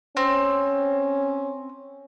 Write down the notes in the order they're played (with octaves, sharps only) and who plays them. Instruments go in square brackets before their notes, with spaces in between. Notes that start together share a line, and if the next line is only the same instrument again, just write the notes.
[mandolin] C4 [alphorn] C#4